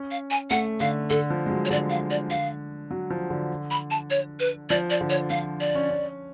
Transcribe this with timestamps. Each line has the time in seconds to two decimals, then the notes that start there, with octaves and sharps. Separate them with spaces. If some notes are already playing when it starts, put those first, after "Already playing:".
Already playing: C#4
0.11 F5
0.31 G#5
0.50 A3 F#5
0.80 D3 F5
1.10 D3 A4
1.30 F3
1.46 G#3
1.50 F#3
1.65 C#5
1.70 D3 D5
1.90 F5
2.11 D5
2.30 F5
2.91 F#3
3.10 F3
3.30 D3
3.71 B5
3.91 A5
4.10 C#5
4.40 B4
4.70 F3 D5
4.90 D5
5.01 D3
5.10 C#5
5.30 F3 F5
5.60 D5
5.75 C#4
5.90 C#4